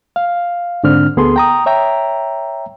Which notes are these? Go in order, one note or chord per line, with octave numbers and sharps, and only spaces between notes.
F5
G#2 D3 C4 D4 F6
D2 B3 G#4 A4 C6
G5 A#5 D#6
C#5 E5 G5 A#5